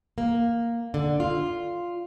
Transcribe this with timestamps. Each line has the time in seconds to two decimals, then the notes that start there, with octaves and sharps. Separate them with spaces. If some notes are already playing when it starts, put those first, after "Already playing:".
0.18 A#3
0.94 D3
1.20 F4